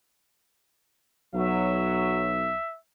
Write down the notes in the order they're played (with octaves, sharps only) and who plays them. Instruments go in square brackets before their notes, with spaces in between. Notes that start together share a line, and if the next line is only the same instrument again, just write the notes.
[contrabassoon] B1 [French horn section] F#3 [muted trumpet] E5